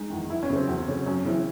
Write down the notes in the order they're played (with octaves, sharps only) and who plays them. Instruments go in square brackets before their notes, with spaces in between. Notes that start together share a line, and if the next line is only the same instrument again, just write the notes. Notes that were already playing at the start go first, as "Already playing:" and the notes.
Already playing: [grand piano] G#3 D#4
[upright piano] E2 D#3
[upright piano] E2 [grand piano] E4
[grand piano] C#4
[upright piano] C#3 F#3 A3
[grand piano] C4
[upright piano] E2
C#3 F#3 A3
[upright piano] F#2 [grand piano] C#4
[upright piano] C#3 E3 C4 E4